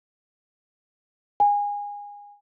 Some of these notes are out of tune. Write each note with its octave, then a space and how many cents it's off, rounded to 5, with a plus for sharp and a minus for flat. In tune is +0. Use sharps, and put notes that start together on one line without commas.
G#5 -25